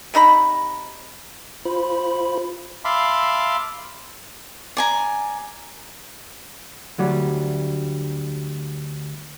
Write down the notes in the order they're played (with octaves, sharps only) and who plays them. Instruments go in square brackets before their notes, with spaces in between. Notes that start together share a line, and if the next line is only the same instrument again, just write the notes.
[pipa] C3 D#4 A#5 B5
[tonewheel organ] F4 C5 B5
[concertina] E5 F5 A5 B5 C6 D6
[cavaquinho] D5 G#5 A#5
[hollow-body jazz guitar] D2 F#3 G3